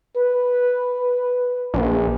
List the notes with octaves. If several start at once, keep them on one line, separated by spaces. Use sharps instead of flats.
B4
A#1